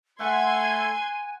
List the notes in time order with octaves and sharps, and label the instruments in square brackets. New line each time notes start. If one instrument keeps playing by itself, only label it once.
[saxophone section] A3 [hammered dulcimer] F#5 [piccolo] G#5 [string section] C6 G#6